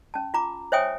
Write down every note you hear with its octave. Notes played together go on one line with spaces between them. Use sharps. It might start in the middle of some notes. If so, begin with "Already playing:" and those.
C#4 A5
F4 A#5 D6
C5 C#5 E5 G5 G#5 D#6